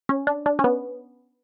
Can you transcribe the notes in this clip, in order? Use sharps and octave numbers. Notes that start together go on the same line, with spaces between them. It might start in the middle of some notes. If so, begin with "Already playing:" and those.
C#4
D4
D4
C#4
B3